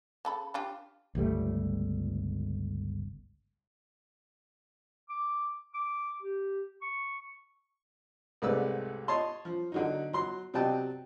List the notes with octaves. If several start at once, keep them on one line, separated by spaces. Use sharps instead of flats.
C#3 A4 B5
D4 F4 G4
G1 C#2 G3 A3
D6
D6
G4
C#6
C2 G#2 A3 B4 D5 E6
C#5 D#5 A5 C6
F3
D3 F#3 D#4
F#3 C6
C3 F#3 D5 D#5 G5 A5